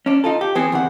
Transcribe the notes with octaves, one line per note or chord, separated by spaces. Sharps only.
C#4 D4
D#4 F4 A4
G4
E3 B3 C4 G#4
E2 C3 D#3 F#5